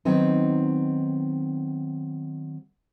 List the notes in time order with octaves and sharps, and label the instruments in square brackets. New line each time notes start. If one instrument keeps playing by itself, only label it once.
[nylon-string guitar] D#3 F#3 B3 C4 D#4